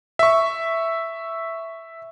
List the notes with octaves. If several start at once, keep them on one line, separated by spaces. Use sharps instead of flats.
E5 C#6